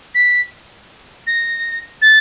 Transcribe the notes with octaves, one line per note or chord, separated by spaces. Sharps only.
B6
A#6
A6